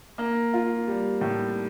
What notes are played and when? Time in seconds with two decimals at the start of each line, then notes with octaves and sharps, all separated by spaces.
0.18 A#3
0.54 F4
0.88 G3
1.21 A2